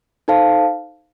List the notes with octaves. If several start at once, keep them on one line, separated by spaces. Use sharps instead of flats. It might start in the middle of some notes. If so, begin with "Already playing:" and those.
D#4 A4 C5 F5 A5